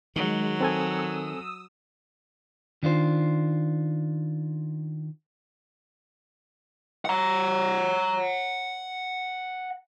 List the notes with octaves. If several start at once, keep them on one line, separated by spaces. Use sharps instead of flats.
D#3 F#3 G#3
C4 A4 G#5 D#6 E6
D#3 D4 F4 C5
F#5 A#5